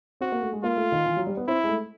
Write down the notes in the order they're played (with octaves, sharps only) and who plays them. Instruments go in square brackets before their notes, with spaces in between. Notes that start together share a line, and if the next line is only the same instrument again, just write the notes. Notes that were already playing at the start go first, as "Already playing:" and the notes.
[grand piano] C4 [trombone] F#4
[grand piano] A#3
A3
G#3
[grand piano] A#3 [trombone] F4
[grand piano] A3
D#3
E3
F#3
G3
B3
[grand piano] C4 [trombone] E4
[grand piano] G#3
A3